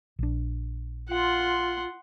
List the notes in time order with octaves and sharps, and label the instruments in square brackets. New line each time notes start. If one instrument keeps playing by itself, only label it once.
[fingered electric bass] A#1 D4
[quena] F4 [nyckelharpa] F#5 C6